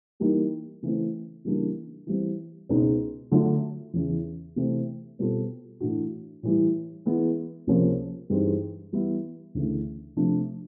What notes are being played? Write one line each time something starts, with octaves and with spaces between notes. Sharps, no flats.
E3 G3 A#3 D#4
C#3 E3 A3 C4
C#3 E3 G3 A#3 D4
E3 G3 C4
C#2 B2 G#3 C4 D#4
D3 F#3 A3 D4 F4
E2 C#3 E3
C3 E3 A3 C4
B2 G3 C4 F4 A4
A2 E3 A3 D4 F#4
A2 E3 G3
E3 G#3 B3
C#2 C3 F3 A#3 C#4
G2 E3 G#3 C4 D#4
E3 G3 B3 E4
D2 C#3 E3 A3
C3 F3 A3 D4